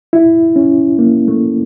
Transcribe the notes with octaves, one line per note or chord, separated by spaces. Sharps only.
E4
C#4
A#3
A3